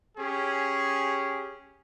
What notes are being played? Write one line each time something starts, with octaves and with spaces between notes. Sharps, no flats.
C#4 G4 G#4